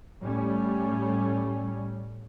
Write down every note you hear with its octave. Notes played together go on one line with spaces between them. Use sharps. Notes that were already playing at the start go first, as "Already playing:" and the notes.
A2 G3 A3 C#4